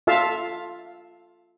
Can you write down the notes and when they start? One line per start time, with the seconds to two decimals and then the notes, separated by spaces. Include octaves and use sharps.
0.07 F4 A4 E5 F5 A5